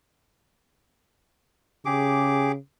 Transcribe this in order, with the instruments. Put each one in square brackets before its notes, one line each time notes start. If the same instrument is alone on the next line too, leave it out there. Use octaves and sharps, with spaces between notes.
[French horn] C#3 [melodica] G4 G#4 D6